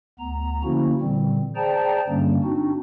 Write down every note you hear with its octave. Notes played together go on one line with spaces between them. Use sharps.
D2 B3 A#5
D3 F3 A#3 C#4 E4 F#4
A#2 D3 E3 G3 C4
G#4 C5 D5 G5 A5 A#5
G2 D3 G3 A#3 C#4
C4 D4 D#4 F#4